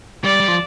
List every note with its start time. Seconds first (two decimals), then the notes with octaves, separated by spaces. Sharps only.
0.24 G3 D5
0.40 G3
0.48 F3